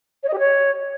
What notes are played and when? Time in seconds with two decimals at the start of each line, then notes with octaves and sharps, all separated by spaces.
0.23 C#5
0.28 D#5
0.33 G4
0.38 C#5